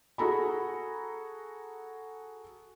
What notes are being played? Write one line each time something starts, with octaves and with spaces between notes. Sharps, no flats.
F#4 G#4 A4 A#5 B5